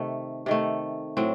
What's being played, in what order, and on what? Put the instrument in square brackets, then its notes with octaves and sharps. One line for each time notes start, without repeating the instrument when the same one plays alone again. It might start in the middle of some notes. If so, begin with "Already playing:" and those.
Already playing: [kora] C3 D#3 A3
C3 D#3 A3
A2 F#3 C4